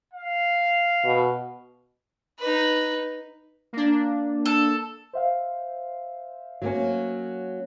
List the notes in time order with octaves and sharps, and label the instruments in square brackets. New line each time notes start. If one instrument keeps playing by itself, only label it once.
[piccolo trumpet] F5
[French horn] B2
[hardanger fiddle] D#4 B4
[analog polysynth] A#3 D4
[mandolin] A4
[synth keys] C5 E5 F5
[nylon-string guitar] F#3 A#3 C#4